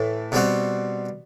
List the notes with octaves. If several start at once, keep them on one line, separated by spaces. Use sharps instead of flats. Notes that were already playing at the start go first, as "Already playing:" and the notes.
Already playing: A2 E3 A3
B2 G3 C4 F#4